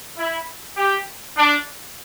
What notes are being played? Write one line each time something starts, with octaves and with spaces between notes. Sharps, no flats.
E4
G4
D4